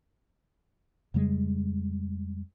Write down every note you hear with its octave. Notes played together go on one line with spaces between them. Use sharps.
F2 C#3 G3 G#3